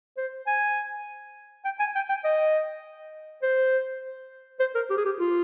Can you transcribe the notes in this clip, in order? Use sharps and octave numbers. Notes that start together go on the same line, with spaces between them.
C5
G#5
G5
G#5
G5
G5
D#5
C5
C5
A#4
G4
G#4
G4
F4